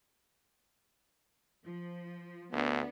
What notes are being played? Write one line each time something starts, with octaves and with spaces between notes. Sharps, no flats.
F3
D2 B3 D4